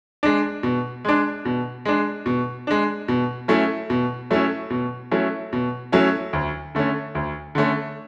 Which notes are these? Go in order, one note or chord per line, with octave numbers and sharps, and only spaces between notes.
G#3 D4
B2
G#3 D4
B2
G#3 D4
B2
G#3 D4
B2
F#3 A3 C#4 E4
B2
F#3 A3 C#4 E4
B2
F#3 A3 C#4 E4
B2
F#3 A3 C#4 E4
D2
D3 A3 C#4
D2
D3 A3 C#4